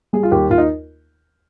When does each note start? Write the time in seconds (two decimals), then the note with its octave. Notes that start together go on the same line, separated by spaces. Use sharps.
0.13 G3 G#4
0.23 F4
0.32 D#2 G4
0.50 D#2 F4
0.58 D#4